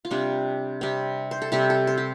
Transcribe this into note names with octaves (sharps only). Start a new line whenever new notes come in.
F4
C3 G3 C4 D4
C3 G3 C4
C5
A4
C3 G3 C4 G4
A4
C5
G4